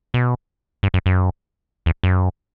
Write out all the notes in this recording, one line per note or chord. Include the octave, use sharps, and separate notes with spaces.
B2
G2
F#2
F#2
E2
F#2